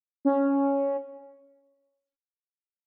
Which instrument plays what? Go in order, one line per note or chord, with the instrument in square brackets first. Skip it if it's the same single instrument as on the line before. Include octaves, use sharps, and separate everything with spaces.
[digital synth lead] C#4